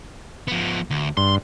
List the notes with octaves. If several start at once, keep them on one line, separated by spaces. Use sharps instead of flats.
F3 B3
D2
G2 C6